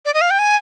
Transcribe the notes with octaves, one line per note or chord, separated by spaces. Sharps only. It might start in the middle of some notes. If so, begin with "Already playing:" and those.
D5
D#5
F5
G5
G#5